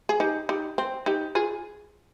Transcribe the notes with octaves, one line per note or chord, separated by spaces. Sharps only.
G#4
D#4 G4
D#4 G4
C4
D#4 G4
F4 G#4